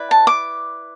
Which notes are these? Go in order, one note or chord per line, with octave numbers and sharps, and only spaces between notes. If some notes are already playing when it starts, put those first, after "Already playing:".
Already playing: E4 B4 D5
A5
D6